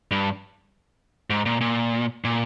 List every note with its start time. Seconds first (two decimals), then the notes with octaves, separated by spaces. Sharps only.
0.11 G2
1.30 G#2
1.46 A#2
1.61 A#2
2.24 A#2